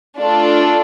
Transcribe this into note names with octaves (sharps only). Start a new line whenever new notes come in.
A3 D4 F4 A4